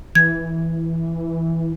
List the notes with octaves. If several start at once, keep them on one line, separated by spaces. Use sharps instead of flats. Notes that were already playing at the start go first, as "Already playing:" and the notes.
E3 G#6